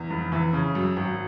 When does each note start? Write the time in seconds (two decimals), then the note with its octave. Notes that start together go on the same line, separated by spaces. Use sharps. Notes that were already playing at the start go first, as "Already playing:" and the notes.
Already playing: E2
0.10 F1
0.32 E3
0.53 C#3
0.75 F#2
0.97 G#1